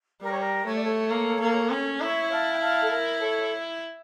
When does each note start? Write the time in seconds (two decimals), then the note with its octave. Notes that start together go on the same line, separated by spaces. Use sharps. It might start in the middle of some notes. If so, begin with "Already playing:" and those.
0.22 G3 A#4
0.31 C#5
0.40 A#4
0.66 A3 C#5
0.74 D5
0.81 A4 C#5
1.11 A#3
1.41 A#3
1.70 C#4
2.01 E4 C#5 E5
2.30 F5 A5
2.53 G5
2.60 F5 A5
2.81 A4
2.90 A#4
3.19 A4 C#5